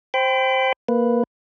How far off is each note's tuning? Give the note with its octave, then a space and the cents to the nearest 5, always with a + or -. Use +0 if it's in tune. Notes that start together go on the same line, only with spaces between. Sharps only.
C5 +5 G5 +0 B5 +40
A#3 +0 B4 +0